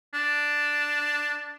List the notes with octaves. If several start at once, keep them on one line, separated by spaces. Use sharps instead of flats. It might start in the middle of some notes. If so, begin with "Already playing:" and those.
D4